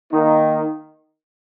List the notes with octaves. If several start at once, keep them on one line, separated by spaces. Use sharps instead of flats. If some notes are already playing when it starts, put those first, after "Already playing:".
D#3 A#3 D#4